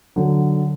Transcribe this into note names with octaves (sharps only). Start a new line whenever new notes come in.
D3 F#3